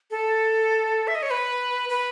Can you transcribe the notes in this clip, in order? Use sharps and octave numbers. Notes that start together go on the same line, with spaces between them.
A4
E5
D#5
C#5
B4
B4